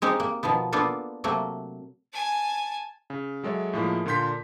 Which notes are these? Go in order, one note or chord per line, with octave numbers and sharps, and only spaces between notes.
G#3 C4 D#4 G4
A#3
B2 D#3 F3 B3
A#3 B3 D4 F4 A4
C3 F#3 A3 A#3
G#5 A5
C#3
F#3 G#3 A4 C#5 E5
A2 F3 G#3 A#3
A#2 D3 A#3 C6 G6 B6